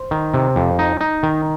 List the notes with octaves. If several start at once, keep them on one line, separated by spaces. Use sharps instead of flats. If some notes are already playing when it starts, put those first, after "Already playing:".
Already playing: C5
D#3
C3
F2
D#4
D#4
D#3